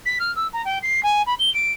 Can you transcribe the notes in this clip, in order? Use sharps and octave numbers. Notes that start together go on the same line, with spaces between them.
B6
F6
E6
A#5
G5
C7
G#5
B5
G7
D7